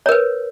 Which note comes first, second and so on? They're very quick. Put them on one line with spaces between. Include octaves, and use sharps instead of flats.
C#5 A#4 B4